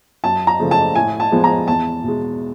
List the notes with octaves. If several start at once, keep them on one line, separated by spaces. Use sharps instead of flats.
F#2 A5
A#5
C#3 F3 A3
A5
A2 G#5
A5
F3 G#3 B3
A#5
E2 A5
B2 G#3